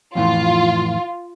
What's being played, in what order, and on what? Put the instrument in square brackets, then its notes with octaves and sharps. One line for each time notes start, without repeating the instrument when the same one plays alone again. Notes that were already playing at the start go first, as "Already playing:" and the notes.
[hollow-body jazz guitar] F2 A2 E3 [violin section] F4